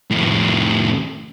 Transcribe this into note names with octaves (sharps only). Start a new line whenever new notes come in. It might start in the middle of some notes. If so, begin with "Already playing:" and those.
F2 A2